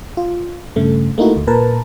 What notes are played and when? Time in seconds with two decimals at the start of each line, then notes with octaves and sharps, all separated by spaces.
0.17 F4
0.76 G2 C#3 A3
1.18 A3 A#3 D#4 E4 F#4
1.36 D2
1.47 A#2 A#4 B4 A5